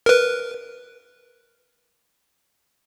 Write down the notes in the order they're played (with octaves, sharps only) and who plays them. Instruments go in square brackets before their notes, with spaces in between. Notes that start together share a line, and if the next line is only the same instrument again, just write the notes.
[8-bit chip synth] A#4 B4